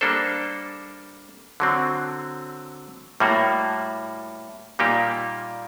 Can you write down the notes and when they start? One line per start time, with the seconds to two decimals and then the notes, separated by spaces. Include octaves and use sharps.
0.01 G3 A#3 D4 A4 C5
1.60 D3 F#3 C4
3.20 A2 G3 A#3 F#4
4.79 A#2 G3 A#3 D#4 G4